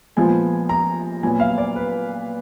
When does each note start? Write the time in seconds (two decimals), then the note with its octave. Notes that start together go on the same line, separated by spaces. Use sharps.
0.17 A#2 F3 G#3 B3 G#5
0.69 A#5
1.23 A#2 F#3 B3 G#5
1.40 F5
1.58 D5
1.76 B4